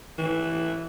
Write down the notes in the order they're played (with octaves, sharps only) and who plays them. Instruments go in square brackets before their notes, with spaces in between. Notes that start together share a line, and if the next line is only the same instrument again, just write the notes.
[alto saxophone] E3